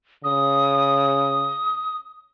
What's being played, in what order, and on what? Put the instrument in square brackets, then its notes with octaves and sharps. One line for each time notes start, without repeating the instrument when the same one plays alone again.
[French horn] C#3 [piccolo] D#6